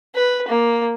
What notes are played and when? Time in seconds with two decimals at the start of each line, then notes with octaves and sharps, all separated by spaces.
0.15 B4
0.48 A#3